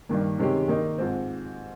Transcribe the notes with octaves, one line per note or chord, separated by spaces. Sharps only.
G2 D#3 A#3
C3 D#3 G#3 C#4 G4
D#3 A#3 D#4
G#2 F3 C4